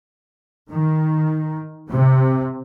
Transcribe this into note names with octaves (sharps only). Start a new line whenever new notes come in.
D#3
C3